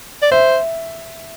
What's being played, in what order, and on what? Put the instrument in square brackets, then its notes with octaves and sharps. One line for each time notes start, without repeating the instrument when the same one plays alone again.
[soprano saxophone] D5
[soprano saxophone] C5 [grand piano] E5